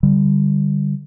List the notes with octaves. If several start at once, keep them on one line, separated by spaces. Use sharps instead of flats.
D3 G3